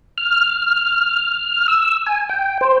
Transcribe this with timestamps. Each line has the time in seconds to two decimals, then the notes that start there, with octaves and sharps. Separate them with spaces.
0.18 F6
1.68 E6
2.06 G#5
2.29 G5
2.61 C5